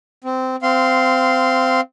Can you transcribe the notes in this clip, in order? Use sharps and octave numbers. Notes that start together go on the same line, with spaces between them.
C4
C4 F5 C6